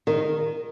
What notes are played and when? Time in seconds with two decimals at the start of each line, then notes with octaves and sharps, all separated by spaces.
0.07 D#3